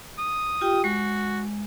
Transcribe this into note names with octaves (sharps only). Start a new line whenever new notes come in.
D#6
F4 G4 G5
G#3 F#4